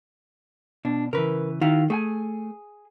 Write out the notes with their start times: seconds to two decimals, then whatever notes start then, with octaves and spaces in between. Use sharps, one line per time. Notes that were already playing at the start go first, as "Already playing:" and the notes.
0.85 B2 D4
1.13 C#3 E3 A#4 B4
1.61 D#3 E4 F#4 F5
1.90 A3 G#4 G5 G#5